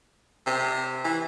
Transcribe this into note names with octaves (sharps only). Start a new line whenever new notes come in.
C3
E3